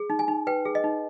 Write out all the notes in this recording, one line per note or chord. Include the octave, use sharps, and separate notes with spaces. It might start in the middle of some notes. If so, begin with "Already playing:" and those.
Already playing: G#4
D#4
G#5
D#4
B4 G5
G#4
D#5
D#4